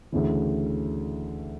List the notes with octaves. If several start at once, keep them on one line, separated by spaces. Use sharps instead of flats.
D2 C#3 E3